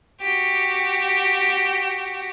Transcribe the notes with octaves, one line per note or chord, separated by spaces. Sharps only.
F#4 G4